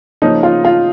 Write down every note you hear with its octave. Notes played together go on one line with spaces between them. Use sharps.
C#3 F3 A#3 C#4 D#4
F4
F4